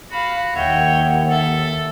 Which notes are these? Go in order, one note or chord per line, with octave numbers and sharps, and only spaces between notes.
F#4 F5 B5
D#2 C#5 E5 F#5 G5
A4 E5